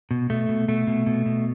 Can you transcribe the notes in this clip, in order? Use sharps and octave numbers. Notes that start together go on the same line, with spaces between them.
B2
B2 A3
B2
B2 A3
B2
B2
B2